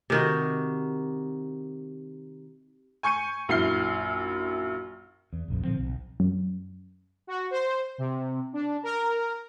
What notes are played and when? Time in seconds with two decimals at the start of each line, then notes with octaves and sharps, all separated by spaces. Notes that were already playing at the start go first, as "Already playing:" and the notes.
0.10 C3 D#3 F#4
3.03 G#5 C#6 G6 C#7 D#7
3.49 A#1 F#2 E4 F6 C7 G7
5.33 E2
5.48 F1 A#1 F2
5.63 A#2 D3 F3 C4
5.78 B1
6.20 F#2
7.27 F#4
7.51 C5
7.98 C3
8.53 D4
8.83 A#4